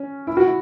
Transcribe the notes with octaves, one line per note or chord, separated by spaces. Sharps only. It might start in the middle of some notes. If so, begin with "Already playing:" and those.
Already playing: C#4
E4
F#4
E4